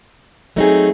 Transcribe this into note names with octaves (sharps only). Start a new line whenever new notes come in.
F#3 A3 C4 D#4 G#4